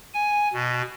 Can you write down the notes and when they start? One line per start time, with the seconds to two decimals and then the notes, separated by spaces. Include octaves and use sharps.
0.14 G#5
0.53 B2